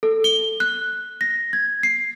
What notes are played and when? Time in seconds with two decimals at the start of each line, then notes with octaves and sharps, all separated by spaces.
0.03 A4
0.24 G7
0.60 F#6
1.21 A#6
1.53 G#6
1.83 C7